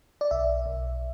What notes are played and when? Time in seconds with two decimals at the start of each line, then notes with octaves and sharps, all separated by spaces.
0.21 D5
0.31 B1 E5
0.66 B1